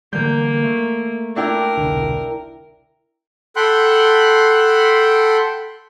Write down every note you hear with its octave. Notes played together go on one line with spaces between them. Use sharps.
D3 E3 G3 A#3 G6
A3
D4 E4 A#4 G5
E1 C2 D3
A4 F#5 G5 B5 C6 F#6